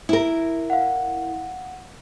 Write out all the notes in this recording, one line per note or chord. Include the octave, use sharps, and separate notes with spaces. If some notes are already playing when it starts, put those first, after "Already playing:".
E4 A#4
F5 F#5